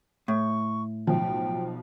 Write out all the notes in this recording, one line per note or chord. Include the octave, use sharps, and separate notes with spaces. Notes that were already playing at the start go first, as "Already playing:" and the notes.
A2 C#6
B1 F3 G5